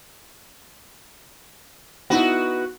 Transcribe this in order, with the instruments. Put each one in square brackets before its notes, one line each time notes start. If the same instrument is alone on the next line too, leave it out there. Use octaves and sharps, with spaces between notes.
[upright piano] B3 D#4 E4 [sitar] F#4 B4